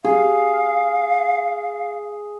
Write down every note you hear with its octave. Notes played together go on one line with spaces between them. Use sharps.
G#4 F5